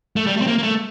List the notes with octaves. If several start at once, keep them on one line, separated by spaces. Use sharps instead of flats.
A3
G3
A3
C4
A#3
A#3
A3